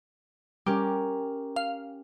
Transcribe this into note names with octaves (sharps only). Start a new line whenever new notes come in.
G3 C#4 G4 A#4
F5